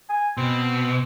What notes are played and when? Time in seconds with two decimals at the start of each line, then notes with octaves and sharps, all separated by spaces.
0.09 G#5
0.37 B2 C4